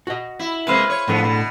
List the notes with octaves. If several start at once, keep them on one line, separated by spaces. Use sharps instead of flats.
F#4 D#5
E4
C3 G#3 A#3 B4 C5 F5
C#5
A2 D3 F3 B3 G#4
B2